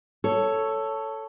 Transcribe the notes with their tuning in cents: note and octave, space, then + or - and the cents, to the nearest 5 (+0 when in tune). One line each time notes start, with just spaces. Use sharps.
A4 +5 C#5 +5